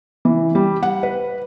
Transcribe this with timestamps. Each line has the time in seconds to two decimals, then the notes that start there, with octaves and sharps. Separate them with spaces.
0.25 E3
0.55 G3
0.83 F#5
1.03 B4